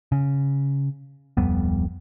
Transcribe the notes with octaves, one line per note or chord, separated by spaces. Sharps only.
C#3
D1 F2 G3 B3